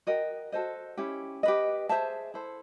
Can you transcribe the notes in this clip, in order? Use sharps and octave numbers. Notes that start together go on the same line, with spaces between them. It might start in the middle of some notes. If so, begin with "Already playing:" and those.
F#4 A#4 D#5 G5
F#4 A4 C5 D#5
C#4 E4 G4
G4 B4 D#5
G#4 C5 E5 A5
E4 A4 C5